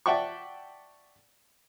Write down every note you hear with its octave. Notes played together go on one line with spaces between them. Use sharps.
D5 E5 F#5 G5 A5 C#6